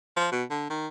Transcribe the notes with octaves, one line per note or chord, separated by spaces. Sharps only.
F3
B2
D3
D#3